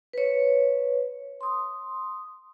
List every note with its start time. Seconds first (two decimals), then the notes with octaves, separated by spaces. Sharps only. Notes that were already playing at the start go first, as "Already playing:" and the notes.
0.13 B4 C#5
1.41 C6 D#6